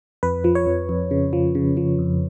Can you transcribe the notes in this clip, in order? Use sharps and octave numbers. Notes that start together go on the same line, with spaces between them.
F2 B4
F3
C#5
F2
F2
C#3
F3
C#3
F3
F2